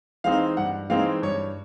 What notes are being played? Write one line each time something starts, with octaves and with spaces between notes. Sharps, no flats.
E3 G#3 C4 D#4 F5
G2 F#5
E3 G#3 C4 D#4 F5
G2 C#5